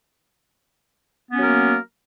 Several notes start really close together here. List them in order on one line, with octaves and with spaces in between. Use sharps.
B3 C#4 F#3 A#4 A#3